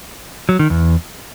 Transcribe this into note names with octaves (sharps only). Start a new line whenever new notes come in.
F#3
D#3
E2